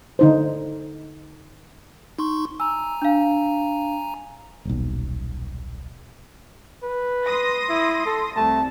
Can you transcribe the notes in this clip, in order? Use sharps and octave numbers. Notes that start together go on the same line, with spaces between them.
D3 D#4 C5
D#4 C6 C#6
G#5 A#5 E6
D4 F5
D#1 B1
B4
C6 D#6 A#6
E4
A4
C2 A3 A5